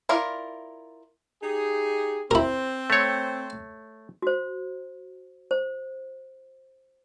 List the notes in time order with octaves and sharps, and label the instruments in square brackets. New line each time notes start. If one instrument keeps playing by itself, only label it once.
[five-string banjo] E4 F4 A#4 D5
[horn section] D#4 G4 G#4
[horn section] C4 [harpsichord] E4 A#4
[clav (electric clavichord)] A3 C#5
[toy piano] F#4 C5
C5